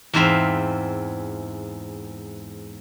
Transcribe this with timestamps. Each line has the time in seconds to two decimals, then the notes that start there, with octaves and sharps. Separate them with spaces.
0.14 E2 G#2 C4 E5 F5